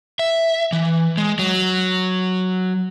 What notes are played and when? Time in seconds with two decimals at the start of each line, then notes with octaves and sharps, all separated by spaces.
0.19 E5
0.73 E3
1.17 G#3
1.39 F#3